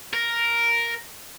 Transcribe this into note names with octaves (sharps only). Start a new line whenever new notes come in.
A#4